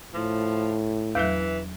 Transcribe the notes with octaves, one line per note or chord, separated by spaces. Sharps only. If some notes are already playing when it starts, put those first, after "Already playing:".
A2 F3
E2 E3 F#3